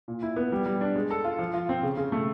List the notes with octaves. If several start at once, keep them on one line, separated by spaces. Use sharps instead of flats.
A#2
E4
B3
G3
G3
D4
G#3
A4
F4
F3
F4
C4
C#3
C#3
A3